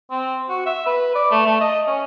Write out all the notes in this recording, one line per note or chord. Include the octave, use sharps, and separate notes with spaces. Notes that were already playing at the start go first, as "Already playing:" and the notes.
C4
F#4
E5
B4
D5
A3
A3
D#5
C#4